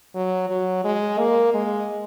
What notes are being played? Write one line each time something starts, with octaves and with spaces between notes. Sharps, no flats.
F#3
F#3
G#3
A#3
G#3